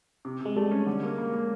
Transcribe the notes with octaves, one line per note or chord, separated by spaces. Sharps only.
C3
C3 G#3
G3 A3
C#4
D3
A#3
A#3
A#3